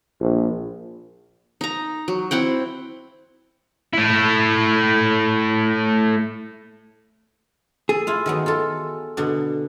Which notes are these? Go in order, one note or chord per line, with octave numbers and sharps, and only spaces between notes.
A#1
D#4 A#5
F#3
C4 E4 F#5 G5
A3 E4
G#4 A4
E4 F4 F5
D#3 F#3 B3
F4 A4
B2 D3 D4